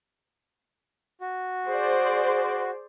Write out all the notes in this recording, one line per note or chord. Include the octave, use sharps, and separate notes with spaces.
F#4
G#4 C5 D5